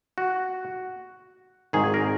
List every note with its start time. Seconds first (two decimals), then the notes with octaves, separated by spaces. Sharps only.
0.18 F#4
1.73 G#1 G#2 D#3 G#4
1.94 A#4